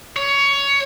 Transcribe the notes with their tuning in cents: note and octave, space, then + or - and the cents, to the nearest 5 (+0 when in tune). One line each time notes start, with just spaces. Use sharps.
C#5 +15